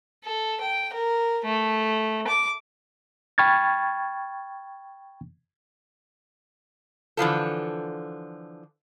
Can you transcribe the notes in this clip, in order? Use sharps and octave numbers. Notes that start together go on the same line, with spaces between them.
A4
G5
A#4
A3
D6
G5 B5 C#6 F6 G#6 A6
D3 E3 F3 A4